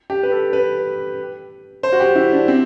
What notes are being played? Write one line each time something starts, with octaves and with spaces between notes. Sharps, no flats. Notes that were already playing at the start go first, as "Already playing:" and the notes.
G4
B4
A4
B4
C5
F#4
G4
E4
D4
C4